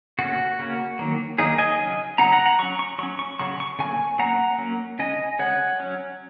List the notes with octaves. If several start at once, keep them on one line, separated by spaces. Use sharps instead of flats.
C#3 A#3 C#4 F#4
C#3 A#3 C#4
D#3 F#3 A#3
D#3 F#3 A#3 D#4 G#4
D#5 G#5
C#3 F#3 C#4
C#3 F#3 C#4 F#5 A#5
F#5 A#5
F#5 A#5
F#3 C#4 C#6
C#6
F#3 C#4 C#6
C#6
C#3 F#3 C#6
C#6
C#3 F#3 A#3 G#5 C#6
F#3 A#3 C#4 F#5 A#5
F#3 A#3 C#4
C#3 G#3 C#4 D#5 G#5
C#3 G#3 C#4 C#5 F#5
F#3 C#4